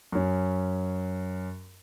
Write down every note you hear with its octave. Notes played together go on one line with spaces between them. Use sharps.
F#2 C#4